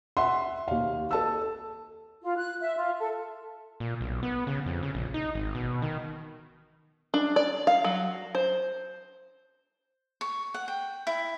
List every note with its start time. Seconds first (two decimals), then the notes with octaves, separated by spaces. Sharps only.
0.17 E5 F#5 C6
0.68 D#2 F5
1.11 A4 A5 E6
2.23 F4
2.37 F#6
2.62 E5
2.76 F4
2.99 A4
3.80 A#2
4.01 B1
4.23 B3
4.47 C#3
4.66 F2
4.83 C#3
4.95 A#1
5.14 D#4
5.35 G#1
5.55 B2
5.82 D#3
7.14 D4
7.36 D5
7.67 F5
7.84 F#3
8.35 C5
10.21 C#6
10.54 F#5
10.68 G5
11.07 E4